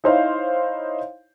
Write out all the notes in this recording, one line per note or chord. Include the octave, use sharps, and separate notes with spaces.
D#4 E4 C5 C#5 F5